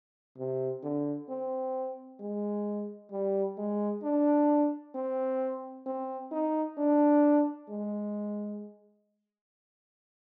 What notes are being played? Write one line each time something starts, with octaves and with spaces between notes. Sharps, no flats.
C3
D3
C4
G#3
G3
G#3
D4
C4
C4
D#4
D4
G#3